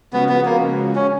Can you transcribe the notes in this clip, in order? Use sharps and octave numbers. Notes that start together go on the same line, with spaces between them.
C#3 F3 G#3 B3 C#4 F#4
B3
A#3
C#4